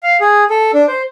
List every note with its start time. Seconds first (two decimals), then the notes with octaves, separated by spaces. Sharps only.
0.03 F5
0.21 G#4
0.50 A4
0.74 D4
0.88 C5